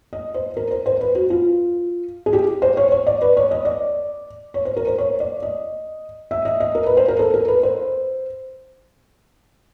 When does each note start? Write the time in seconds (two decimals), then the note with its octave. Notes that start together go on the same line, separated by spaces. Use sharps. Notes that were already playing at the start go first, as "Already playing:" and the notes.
0.13 D#5
0.34 C5
0.57 A#4
0.71 C5
0.86 C5
1.01 B4
1.15 F#4
1.30 F4
2.26 G#4
2.33 G4
2.62 C5
2.77 C#5
2.92 C#5
3.07 D5
3.22 B4
3.37 C#5
3.51 D#5
3.65 D5
4.54 C#5
4.65 C5
4.77 A#4
4.87 C5
4.98 C#5
5.20 D5
5.43 D#5
6.31 E5
6.45 D#5
6.60 D#5
6.75 A#4
6.86 B4
6.97 C5
7.08 A#4
7.19 A4
7.34 A#4
7.48 B4
7.63 C5